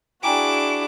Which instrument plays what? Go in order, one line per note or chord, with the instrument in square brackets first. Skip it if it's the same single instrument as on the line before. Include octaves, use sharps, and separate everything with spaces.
[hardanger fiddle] D4 E4 [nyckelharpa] F#4 G#4 [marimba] G5 G#5 A#5 [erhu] D6